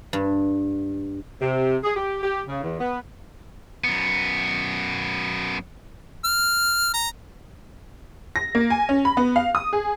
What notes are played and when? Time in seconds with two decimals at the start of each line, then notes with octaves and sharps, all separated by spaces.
0.13 G2
1.41 C3
1.83 G#4
1.95 G4
2.23 G4
2.48 C#3
2.62 E2
2.79 B3
3.84 F#2 B3
6.25 F6
6.94 A#5
8.36 A#6
8.55 A#3
8.70 G#5
8.89 C#4
9.05 B5
9.17 B3
9.36 F5
9.55 D#6
9.73 G#4